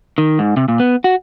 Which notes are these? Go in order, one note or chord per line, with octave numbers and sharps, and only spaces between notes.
D#3
G#2
C3
A#2
B3
F#4